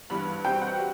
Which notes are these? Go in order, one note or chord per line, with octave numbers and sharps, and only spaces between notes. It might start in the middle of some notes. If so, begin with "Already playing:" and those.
G2 E3 G3 B3 B5
B2 G3 C4 G5
F#5
G3